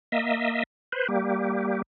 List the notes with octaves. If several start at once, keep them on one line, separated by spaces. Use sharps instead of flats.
A#3 D#5 E5
B4 C5
G3 A#3 G4